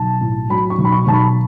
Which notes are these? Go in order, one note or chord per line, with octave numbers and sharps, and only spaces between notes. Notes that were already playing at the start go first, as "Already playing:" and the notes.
Already playing: B1 A5
A2
F#3 B5
C#6
B1
B5
C#6
B1 A5
B5